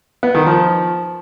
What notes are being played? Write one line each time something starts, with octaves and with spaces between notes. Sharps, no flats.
B3
D#3
F3